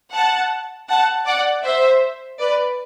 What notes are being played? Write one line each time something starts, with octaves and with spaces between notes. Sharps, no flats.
F#5 A5
F#5 A5
D5 F#5
C5 E5
B4 D5